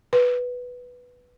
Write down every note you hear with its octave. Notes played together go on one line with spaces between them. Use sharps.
B4